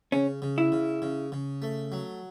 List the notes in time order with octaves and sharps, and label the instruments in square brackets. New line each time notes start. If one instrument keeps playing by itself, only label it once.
[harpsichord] C#3 [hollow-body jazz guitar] C#4
[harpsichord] C#3
[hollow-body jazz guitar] E4
[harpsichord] C#3
C#3
C#3
A3
F#3